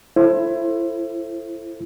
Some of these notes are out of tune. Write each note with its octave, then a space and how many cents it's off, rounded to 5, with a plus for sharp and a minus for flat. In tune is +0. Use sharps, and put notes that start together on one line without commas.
E4 +25 A4 +0 C5 +20